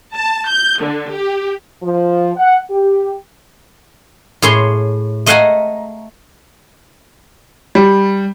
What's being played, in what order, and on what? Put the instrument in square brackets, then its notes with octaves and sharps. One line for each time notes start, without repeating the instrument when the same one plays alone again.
[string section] A5
G6
D3
G4
[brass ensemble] F3
F#5
G4
[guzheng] A2 G#4 C#5 C6
A3 D#5 F5 F#5 G#5 A#5
[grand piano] G3